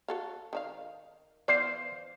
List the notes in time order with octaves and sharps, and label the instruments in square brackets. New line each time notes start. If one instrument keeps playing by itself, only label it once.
[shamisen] F#4 A4 F5
D#3 D4 F5
[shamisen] E3 B3 D5 [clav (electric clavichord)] C5 F5